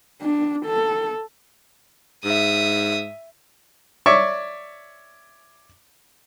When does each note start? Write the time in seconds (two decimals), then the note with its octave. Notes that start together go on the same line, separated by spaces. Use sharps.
0.22 D4
0.66 A4
2.25 G#2 E5 D#6
4.06 C#5 D5 E5 C#6 D6